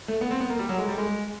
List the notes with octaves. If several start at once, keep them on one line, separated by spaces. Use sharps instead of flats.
A3
B3
C4
B3
A#3
G3
F#3
G#3
G3
G#3